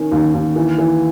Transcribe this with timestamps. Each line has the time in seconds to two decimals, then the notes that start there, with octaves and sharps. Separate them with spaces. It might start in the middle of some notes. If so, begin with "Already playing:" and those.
Already playing: D#3 C#4
0.12 D#2
0.34 D#2
0.56 E3
0.78 E3